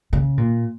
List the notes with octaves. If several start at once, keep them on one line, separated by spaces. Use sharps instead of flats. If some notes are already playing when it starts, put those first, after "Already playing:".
C#3
A#2